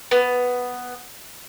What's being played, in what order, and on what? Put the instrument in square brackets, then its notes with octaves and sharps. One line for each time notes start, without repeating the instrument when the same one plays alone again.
[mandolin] B3